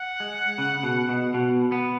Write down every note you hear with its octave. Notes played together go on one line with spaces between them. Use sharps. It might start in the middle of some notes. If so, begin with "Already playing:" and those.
Already playing: F#5
G#3
C#3
B2
B2
B2
B3